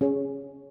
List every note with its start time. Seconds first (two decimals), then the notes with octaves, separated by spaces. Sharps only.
0.01 C#4 G#4 C#5